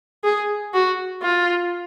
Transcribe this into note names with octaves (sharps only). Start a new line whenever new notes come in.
G#4
F#4
F4